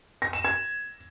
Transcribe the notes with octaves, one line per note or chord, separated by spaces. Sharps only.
A#6
E7
G#6